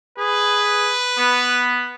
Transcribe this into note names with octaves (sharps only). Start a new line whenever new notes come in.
G#4 B4
B3